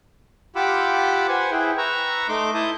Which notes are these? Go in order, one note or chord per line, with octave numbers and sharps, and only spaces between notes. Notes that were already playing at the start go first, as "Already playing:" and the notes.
F4 G4 F#5 B5 D6 E6
B4 C5 F#5 G#5
E4 G#4 B4 G5
B4 A#5 C#6 E6
A3 D#4 C6 D6
E4 A5 D#6 G6